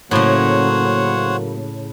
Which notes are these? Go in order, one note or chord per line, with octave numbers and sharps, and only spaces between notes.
A2 C#3 F#3 A#3 C5 C#5 F#5